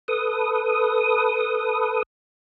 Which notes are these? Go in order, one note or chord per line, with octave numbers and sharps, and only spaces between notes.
A4 B4 D#6